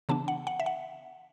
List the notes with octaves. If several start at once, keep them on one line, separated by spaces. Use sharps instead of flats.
C#3 E3 B3 D4 A5
F#5
F#5
E5
F#5